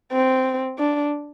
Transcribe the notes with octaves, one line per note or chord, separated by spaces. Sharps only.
C4
D4